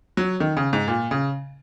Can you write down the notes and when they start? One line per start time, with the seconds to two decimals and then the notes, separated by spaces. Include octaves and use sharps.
0.17 F#3
0.40 D#3
0.57 C#3
0.73 G#2
0.88 A#2
1.11 C#3